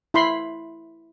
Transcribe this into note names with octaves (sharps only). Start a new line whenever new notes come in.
E4 B5 C6